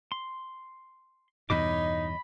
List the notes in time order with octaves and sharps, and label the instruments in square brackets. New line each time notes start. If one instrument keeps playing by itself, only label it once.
[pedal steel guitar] C6
[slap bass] E2 G2 B2 [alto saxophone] D#4 [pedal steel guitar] C#5 D#5 D6 [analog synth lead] B5